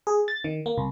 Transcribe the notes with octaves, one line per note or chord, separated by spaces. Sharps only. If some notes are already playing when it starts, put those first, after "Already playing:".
G#4
A6
D#3
A#3
C2